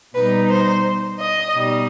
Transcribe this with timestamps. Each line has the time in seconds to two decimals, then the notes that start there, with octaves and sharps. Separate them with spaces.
0.14 B2 G3 D#4 B4
0.50 C5
1.20 D#5
1.54 B2 G3 D#4